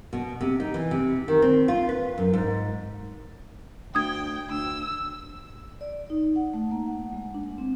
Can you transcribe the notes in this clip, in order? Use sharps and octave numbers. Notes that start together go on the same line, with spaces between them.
B2
C3
D#4
E3
C3
D#3
C4
F4
B4
F#2
G#2
D2 G5 D#6 G#6
D2 E6
D5
D#4
F#5
A3
A#3
F#5
G#3
D4
C4